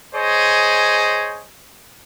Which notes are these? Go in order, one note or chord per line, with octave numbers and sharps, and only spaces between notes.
G#4 C5 C#5 D#5